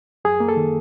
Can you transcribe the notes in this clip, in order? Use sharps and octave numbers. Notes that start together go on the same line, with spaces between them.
F#2 G#4
A#3
A4
D#3